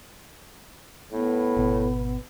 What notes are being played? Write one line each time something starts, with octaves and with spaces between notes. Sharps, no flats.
A2 B3
G#1 B2